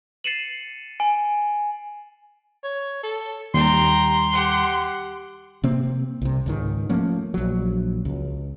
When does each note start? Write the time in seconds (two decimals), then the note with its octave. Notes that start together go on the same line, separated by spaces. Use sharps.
0.24 A6 C7 C#7 D#7 E7 F#7
1.00 G#5
2.64 C#5
3.03 A4
3.54 D#2 G3 G5 A#5 C6
4.33 G4 F#5
5.64 C3 A#3 C4
6.22 C2 C3
6.46 C#2 G#2 D#3
6.89 F3 A3 A#3 C#4
7.34 A#1 F#3
8.05 C#2